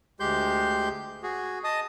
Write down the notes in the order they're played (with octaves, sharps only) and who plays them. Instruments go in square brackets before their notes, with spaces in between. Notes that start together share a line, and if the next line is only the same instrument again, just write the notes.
[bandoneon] D2 G#3 G4 C6 G6
F#4 G#4
D#5 A5 D#6